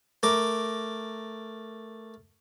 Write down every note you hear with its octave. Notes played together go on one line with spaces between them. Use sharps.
A3 A#4 D6